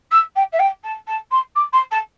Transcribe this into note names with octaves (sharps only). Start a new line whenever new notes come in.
E6
G5
E5
G5
A5
A5
C6
D6
C6
A5